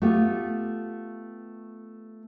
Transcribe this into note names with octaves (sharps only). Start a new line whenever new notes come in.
A3 B3 F4 G4